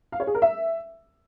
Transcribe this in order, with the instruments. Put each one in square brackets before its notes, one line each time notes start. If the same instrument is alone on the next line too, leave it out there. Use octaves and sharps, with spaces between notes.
[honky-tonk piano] F5
C#5
G#4
A#4
E5